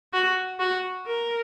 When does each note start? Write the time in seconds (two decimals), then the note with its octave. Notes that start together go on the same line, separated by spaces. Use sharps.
0.13 F#4
0.59 F#4
1.06 A#4